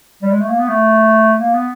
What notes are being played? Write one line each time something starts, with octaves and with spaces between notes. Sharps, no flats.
G3
G#3
A3
A#3
B3
A3
A#3
B3